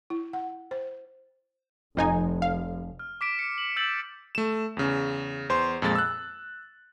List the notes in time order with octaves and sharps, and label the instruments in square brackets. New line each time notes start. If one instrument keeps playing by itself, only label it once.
[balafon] E4
F#5
C5
[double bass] F1 [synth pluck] F2 D#4 G#5
[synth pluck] F5
[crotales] F6
D6 B6 D7 E7
C#7
F#7
E6 G6 A6 E7 F#7
[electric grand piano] A3 E7
E2 C#3
E2 C5 C6
F2 A#2 G#3 A6
E6 F#6